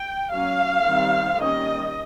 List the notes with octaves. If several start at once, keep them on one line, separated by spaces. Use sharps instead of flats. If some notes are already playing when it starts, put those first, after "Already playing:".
Already playing: G5
F#3 A#3 C#4 F5
D#3 G3 C4
D#3 G3 A#3 C#4 D#5